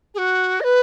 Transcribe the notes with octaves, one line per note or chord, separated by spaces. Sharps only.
G#4
F#4
D#5
B4